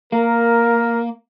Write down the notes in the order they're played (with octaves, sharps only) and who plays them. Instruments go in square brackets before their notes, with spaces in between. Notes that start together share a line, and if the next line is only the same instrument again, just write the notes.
[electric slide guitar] A#3 [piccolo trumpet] A#4